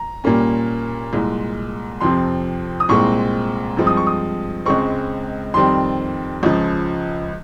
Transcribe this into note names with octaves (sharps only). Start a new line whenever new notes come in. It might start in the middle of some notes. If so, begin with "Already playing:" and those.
Already playing: A#5
A#2 G3 A#3 C#4
C2 A#2 G#3
F2 C3 F3 C4 C6
D#6
C2 A#2 G#3 C4 C#6
G2 F3 G#3 C4
D#6
C#6
D#6
C#2 C#3 G#3 C4 C#6
F2 D#3 G3 C4 C6
C#2 C#3 F3